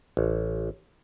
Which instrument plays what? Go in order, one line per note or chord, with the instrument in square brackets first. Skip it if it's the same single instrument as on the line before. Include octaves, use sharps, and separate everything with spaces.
[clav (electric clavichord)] A1